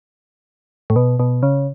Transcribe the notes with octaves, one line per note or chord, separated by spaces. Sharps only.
A2
B2
B2
C#3